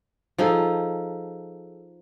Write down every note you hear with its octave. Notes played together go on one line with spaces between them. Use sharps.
F3 D#4 G#4 A4